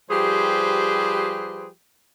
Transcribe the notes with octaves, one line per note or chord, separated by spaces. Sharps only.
F3 G3 G4 G#4 B4 C5